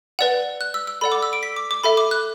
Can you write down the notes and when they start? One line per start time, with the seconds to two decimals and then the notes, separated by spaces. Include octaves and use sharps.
0.19 B4 D5 F#5
0.61 F#6
0.74 E6
0.87 E6
1.01 A4 D5 F#5 B5
1.12 D6
1.22 E6
1.33 D7
1.43 B6
1.56 D6
1.71 D6
1.84 A4 E5 B5
1.97 D6
2.11 F#6